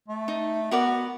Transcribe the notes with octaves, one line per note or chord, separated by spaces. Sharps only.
A3
D#4
B3 F#4 A#4 D5